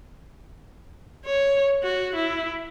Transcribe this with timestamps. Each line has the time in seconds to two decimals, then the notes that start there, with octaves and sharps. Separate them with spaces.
1.26 C#5
1.83 F#4
2.16 E4